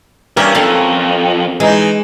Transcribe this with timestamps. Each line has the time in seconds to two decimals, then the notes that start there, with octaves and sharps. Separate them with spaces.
0.37 G2 C#4 G4 A#4 E5
0.55 F2 A4 F5
1.60 E3 G#3 D#4